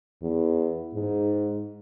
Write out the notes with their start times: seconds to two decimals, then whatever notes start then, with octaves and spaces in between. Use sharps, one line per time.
0.22 E2
0.94 G#2